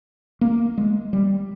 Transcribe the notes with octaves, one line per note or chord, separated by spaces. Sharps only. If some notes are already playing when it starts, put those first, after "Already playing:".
A#3
G#3
G3